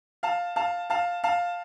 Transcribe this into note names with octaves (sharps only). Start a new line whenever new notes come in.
F5 A5
F5 A5
F5 A5
F5 A5